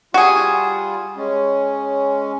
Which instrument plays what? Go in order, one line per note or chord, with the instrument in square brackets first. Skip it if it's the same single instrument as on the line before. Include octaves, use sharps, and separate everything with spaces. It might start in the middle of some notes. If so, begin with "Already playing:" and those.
[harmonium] G3 F4 [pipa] F#4 G#4
[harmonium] G#3 C#4